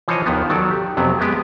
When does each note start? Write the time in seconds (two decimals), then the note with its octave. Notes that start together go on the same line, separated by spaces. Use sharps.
0.08 E3 F3 C5 C#5 D#5
0.26 D#2 D#3 F3 B3
0.49 D#3 F#3 A4 D5
0.71 G4
0.97 F2 C3 F#3 B3
1.19 G#3 B3 G4 G#4